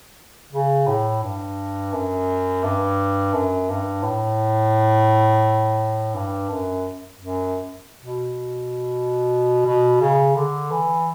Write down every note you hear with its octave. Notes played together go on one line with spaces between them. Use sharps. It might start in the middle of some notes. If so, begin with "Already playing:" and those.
C#3
A2
G2
F#2
G2
F#2
G2
A2
G2
F#2
F#2
B2
B2
C#3
D3
E3